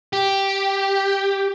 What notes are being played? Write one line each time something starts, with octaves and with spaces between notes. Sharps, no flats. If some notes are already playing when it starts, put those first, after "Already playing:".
G4